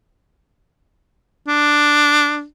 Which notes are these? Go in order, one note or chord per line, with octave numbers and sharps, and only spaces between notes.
D4